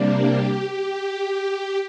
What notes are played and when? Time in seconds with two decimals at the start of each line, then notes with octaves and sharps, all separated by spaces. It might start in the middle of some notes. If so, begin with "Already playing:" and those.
Already playing: C3 G3 A#3 D4
0.16 G4
0.69 G4